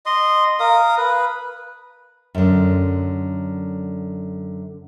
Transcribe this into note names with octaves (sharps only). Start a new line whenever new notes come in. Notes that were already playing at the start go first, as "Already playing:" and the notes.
D#5 C6
A#4 F5 D#6
B4
F#2 D3